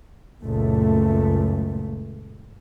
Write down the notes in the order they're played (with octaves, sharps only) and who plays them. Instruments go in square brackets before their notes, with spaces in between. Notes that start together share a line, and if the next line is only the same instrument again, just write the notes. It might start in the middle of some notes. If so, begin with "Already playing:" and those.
[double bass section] F#1 C#2 F#2 A#2 A3